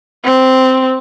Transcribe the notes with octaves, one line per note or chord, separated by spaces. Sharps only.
C4